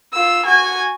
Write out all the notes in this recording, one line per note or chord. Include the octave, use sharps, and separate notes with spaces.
F4 E6
F#4 G#5